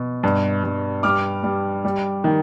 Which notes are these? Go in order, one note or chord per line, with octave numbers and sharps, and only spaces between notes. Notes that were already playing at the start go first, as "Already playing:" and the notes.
Already playing: B2
G2
G2
G3 D6 F6
G3
G3
D#3